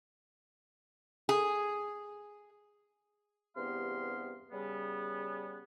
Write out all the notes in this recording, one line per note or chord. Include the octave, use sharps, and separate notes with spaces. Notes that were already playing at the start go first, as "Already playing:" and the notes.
G#4
E2 G2 C3 B3 F5 C6
C#3 G3 B3